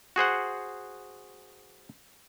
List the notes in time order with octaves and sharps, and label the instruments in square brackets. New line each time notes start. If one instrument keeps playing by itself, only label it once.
[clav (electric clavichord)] F#4 G#4 C5 F#5